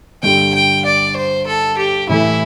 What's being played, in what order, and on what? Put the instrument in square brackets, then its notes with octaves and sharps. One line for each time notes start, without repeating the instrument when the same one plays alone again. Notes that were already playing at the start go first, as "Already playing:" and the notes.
[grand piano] G2 D3 G3 [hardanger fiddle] G5
[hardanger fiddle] G5
D5
C5
A4
G4
[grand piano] A2 E3 A3 [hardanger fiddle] E4